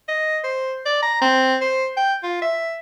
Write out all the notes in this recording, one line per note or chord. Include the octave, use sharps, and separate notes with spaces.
D#5
C5
D5
A#5
C4
C5
G5
F4
E5